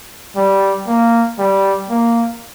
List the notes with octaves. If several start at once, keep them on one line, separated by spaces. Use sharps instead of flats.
G3
A#3
G3
A#3